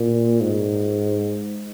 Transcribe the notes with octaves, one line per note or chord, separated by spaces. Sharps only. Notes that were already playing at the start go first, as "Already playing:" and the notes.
Already playing: A#2
G#2